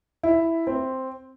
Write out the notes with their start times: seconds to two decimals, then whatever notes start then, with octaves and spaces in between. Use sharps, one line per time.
0.23 E4
0.67 C4